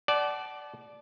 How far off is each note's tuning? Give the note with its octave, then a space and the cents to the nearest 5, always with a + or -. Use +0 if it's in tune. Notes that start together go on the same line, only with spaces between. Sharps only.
D5 +0 F#5 +35 A5 -25